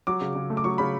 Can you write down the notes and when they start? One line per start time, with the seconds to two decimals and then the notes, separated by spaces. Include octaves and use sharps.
0.07 F#3 D6
0.21 C#3
0.35 C#3
0.50 A3
0.57 D6
0.64 F#3 C#6
0.78 C#3 B5